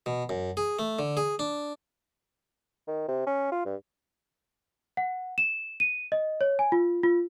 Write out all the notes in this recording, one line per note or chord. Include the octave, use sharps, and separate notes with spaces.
B2
F#2
G#4
A3
D3
G#4
D4
D#3
C3
C#4
F4
G2
F#5
E7
D#7
D#5
C#5
G#5
F4
F4